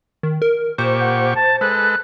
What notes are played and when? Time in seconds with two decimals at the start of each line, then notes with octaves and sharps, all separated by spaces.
0.23 D#3
0.42 A#4
0.78 A#2 G4 C5 C#6
1.00 F#5
1.35 A5
1.61 G#3 A4 B4 F#6